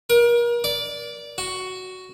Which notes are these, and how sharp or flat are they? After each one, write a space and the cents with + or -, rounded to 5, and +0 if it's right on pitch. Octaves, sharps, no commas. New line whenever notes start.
A#4 +35
D5 -15
F#4 +5